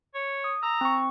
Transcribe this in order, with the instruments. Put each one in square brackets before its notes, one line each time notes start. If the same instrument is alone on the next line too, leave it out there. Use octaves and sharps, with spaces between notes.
[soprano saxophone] C#5
[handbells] D#6
[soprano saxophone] A#5 [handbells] E6
[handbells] C4 C#6